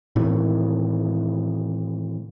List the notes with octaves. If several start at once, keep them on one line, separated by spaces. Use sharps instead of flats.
A2 C3 D#3 E3